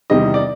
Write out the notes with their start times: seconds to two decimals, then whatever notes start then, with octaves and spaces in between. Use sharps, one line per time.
0.10 E2 C3 D#3 G3 D#5
0.34 D5